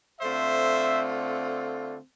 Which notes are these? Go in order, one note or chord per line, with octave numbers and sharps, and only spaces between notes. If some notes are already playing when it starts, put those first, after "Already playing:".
D3 A3 C4 F4 C5 E5